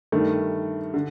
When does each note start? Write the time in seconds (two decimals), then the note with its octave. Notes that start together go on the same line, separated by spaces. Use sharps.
0.12 G2 D#3 A3
0.94 D3